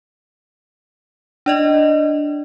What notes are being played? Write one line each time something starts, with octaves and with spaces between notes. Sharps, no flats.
D4 D5 D#5